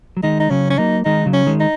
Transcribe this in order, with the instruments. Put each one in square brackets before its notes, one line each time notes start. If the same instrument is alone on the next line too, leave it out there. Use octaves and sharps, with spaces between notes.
[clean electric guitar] F#3
[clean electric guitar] D#3 G#3 [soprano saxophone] D#4
[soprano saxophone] D#4
[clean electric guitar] C#3 F#3 [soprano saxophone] C#4
[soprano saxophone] C#4
[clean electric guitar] F#3 A#3 [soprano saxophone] D#4
[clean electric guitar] D#3 G#3 [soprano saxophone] D#4
[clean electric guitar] C#3 F#3
[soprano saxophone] C#4
[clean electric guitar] D#3 G#3
[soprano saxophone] D#4